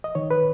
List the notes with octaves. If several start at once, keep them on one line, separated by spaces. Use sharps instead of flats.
D#5
D#3 C#5
B4